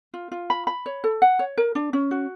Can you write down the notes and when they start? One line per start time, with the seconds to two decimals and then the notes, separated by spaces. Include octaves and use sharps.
0.14 F4
0.32 F4
0.50 B5
0.67 B5
0.86 C#5
1.04 A4
1.22 F#5
1.39 C#5
1.58 A#4
1.75 D4
1.93 C#4
2.11 F#4